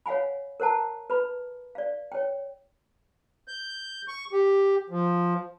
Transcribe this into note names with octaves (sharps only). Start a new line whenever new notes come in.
C#5 F5 F#5 G#5 B5
A#4 C5 F#5 A5 A#5
B4 B5
D5 F5
C#5 G5
G6
C#6
G4
F3